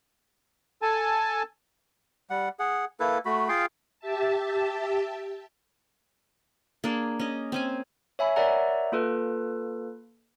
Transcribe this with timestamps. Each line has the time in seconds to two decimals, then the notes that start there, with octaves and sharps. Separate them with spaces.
0.82 A4 G#5 A5
2.30 G3 F#5
2.59 G#4 F#5
3.00 A#3 E4 A4 B4
3.25 A3 F#4 B5
3.49 F4 G#4 F5 G5
3.99 G4 E5 A5
6.84 A#3 D4 G#4
7.19 C#4 D#5
7.52 C4 C#4 G#5
8.19 C#5 E5 G#5 B5
8.36 A#4 C#5 D5 E5 F#5 A#5
8.92 A#3 F4 A4 B4